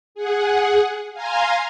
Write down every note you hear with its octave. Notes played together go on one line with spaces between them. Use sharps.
G#4 F#5
F5 G#5 A#5 C6